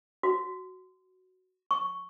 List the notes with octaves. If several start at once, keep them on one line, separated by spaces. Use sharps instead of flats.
F#4
C#6